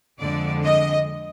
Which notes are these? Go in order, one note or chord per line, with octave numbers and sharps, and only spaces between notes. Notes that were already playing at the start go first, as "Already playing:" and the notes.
F2 D3 G#3 D5
D#5